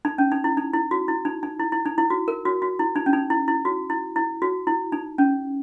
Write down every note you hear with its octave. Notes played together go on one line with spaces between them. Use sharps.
D#4
C#4
D#4
E4
D#4
E4
F#4
E4
D#4
D#4
E4
E4
D#4
E4
F#4
A#4
F#4
F#4
E4
D#4
C#4
D#4
E4
E4
F#4
E4
E4
F#4
E4
D#4
C#4